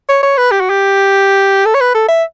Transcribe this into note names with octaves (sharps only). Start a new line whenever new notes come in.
C#5
C#5
B4
G4
F#4
G4
A4
C#5
B4
A4
E5